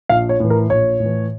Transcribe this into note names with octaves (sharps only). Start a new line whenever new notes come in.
A#1 F5
C#5
A2 E3
A#4
A#1 C#5
A2 E3